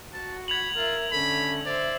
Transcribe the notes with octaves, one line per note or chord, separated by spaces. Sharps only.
F#4 A5
B5 G#6 F7 F#7
F4 A#4 E5
D3 A3 C#4 B5
C5 D5 E5